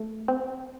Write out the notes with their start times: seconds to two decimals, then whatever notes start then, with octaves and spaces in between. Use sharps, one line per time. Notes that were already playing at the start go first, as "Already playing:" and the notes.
Already playing: A3
0.28 C4